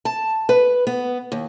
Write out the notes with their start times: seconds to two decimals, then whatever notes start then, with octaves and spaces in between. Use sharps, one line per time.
0.05 A5
0.49 B4
0.87 B3
1.32 D#2